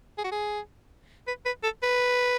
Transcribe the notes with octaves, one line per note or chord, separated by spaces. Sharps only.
G#4
F#4
G#4
B4
B4
A4
B4